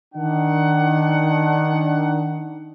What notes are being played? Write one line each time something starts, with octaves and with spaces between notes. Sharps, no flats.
D#3 D4 F#5